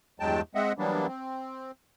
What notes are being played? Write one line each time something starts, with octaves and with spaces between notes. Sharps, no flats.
E2 G2 F#3 G#3 G5 A5
G#3 C4 D#5 E5 F#5
E3 F#3 G3 A#3 B3 D4
C4